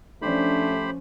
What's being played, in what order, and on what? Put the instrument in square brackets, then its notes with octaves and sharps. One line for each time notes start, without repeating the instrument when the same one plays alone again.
[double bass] F3 C#4 [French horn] A3 [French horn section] D4 [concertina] G4 C5 B5